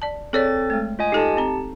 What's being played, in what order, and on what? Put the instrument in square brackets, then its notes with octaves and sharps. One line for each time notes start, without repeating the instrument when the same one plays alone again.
[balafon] D5 A5
[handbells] C4 A4 A6 [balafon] G#4 C#5 D5
[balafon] G#3 A3
[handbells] F4 D#5 G#5
[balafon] D#4 A4 [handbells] G4 A5
[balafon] C4 A#5